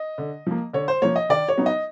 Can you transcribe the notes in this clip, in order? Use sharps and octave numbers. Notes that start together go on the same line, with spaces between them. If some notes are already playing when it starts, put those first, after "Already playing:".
Already playing: D#5
D3
F3 A#3
D3 C#5
C5
F3 A#3 C#5
D#5
D#3 D5
C#5
F#3 B3 D#4
D#5